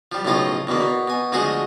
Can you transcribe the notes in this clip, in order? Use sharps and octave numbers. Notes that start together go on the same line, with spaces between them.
F3 G3
B1 A2 C#3 F3 F4 D#5
E2 B2 D3 A#3
B2
B2 G#5
D2 F3 G#3 F#4 G#4 D#5